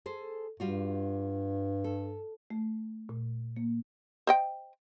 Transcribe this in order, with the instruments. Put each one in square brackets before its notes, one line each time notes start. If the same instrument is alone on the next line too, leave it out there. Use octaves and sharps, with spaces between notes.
[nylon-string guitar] G#4 A4 C5
[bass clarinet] G2 [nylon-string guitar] G3 F4 F#4
[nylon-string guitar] A4
[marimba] A3
A#2
A#3
[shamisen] C5 D#5 G5